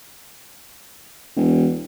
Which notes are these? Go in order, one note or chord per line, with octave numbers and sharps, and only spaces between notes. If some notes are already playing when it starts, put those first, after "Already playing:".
E1